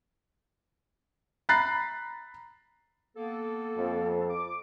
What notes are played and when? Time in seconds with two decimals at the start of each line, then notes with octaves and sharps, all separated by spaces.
1.49 A#5 B5 F#6 A6 C7
3.17 A#3 B3 A4
3.76 F2
4.30 D6